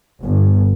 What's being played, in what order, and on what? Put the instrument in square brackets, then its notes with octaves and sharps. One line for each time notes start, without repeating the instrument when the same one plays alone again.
[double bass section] G1